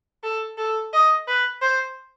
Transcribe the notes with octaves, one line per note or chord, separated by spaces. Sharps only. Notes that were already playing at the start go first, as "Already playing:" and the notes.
A4
A4
D#5
B4
C5